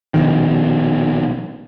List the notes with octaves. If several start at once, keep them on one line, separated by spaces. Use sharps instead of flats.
A#1 B2 D#3